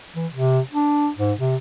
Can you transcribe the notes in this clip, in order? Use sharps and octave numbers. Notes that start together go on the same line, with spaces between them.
E3
C3
D4
G#2
C3